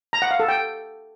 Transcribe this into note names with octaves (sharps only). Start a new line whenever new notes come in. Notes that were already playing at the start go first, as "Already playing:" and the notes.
A#5
F#5
F5
A4
G5